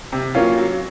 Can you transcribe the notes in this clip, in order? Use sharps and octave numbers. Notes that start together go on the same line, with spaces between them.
C3
F#3 A#3 C#4 F4
F#3